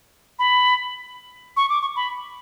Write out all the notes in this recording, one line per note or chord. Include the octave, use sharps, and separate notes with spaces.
B5
C#6
D6
C#6
B5